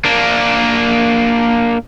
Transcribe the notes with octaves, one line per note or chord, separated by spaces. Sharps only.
A#3 D4